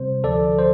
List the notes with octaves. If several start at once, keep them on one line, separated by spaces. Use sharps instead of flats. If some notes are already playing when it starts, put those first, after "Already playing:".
Already playing: C3 G3 C4 C5
D2 D3 F3 A4 D5
C5